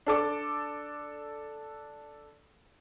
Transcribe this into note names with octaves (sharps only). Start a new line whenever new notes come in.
D4 A4 D6